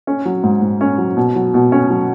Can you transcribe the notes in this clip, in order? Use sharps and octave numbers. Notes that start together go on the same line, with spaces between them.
C#4
F#3
G#2
G#2
C#4
F#3
B2
F#3
B2
C#4
F#3